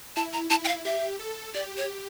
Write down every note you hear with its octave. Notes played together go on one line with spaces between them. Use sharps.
E4 A5
A#5
E4 A5
G5
F5
G4 E5
A4
G4 D5
C#5